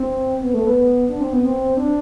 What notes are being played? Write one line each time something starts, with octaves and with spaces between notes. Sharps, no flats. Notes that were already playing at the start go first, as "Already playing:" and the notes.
Already playing: C4
B3
A3
B3
D4
C4
B3
C4
D4